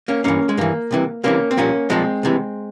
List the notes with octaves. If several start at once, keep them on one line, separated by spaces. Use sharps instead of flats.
A#3 C#4
G2 E3 A#3 C#4
G#3
G2 E3 A#3
C2 C3 E3
C2 C3 E3 A#3 C#4
C4
C2 A#2 F3 A#3 C#4
C2 A#2 F3 G#3 C4
C2 C3 E3